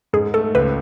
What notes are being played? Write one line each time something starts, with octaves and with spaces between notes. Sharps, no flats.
G#2 G#4
A3 A4
C#2 B4